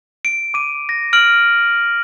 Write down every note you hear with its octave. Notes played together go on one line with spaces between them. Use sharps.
D7
D6 D#7
A#6
F6 D7 F#7